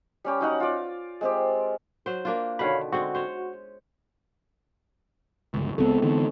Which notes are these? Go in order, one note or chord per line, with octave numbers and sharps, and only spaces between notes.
G3 C#4 G4
F#3 D#4 F#5
F4 D5
G#3 C4 G4
F#3 C5
A#3 D4 F4
B2 D3 D#3 C#5 F5 B5
D3 G#3 C4 F#4
C5 C#5
G1 C#2
C#2 F#3 G#3 B3 C4 A4
D3 E3 B3 D#4